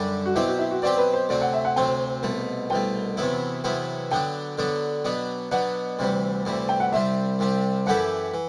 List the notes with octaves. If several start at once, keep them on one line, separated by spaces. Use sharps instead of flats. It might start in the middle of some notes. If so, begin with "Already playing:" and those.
Already playing: F#2 D3 G3 D4
F#4
B2 F#3 C4 E4 G4
F#4
E4
F#4
B2 F#3 C4 G4 D5
B4
C5
D2 C3 F#3 C4 D5
F#5
E5
F#5
D2 C3 F#3 C4 G5
C2 B2 A3
C2 B2 A3 G5
E2 C3 F#3 B3 E4
E2 C3 F#3 B3 E4
D3 F#3 B3 D4 G5
D3 F#3 B3 D4
B2 F#3 B3 D4
B2 F#3 B3 D4 F#5
D2 C3 E3 G3
D2 C3 E3 G3
G5
F#5
C2 C3 G3 C4 E5
C2 C3 G3 C4
F#2 E3 A3 E4 G4 F#5
E3